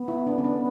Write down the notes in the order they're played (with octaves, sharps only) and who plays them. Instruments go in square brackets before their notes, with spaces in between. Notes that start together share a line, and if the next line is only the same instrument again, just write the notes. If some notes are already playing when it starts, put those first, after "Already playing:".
Already playing: [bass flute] B3
[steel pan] E4
D4
C#4
D4